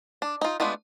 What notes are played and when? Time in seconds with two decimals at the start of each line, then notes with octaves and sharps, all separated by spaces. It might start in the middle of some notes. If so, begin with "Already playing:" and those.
0.22 D4
0.41 D#4 F4
0.60 G#3 A3 B3 D4 F4